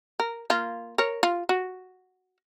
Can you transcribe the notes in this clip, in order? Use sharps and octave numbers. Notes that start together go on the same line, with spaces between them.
A#4
A#3 F4
A#4 C#5
F4
F#4